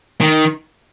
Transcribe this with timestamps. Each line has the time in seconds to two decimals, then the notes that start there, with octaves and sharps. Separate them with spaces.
0.21 D#3